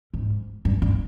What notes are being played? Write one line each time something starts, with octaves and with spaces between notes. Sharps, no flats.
G#2
G2
G2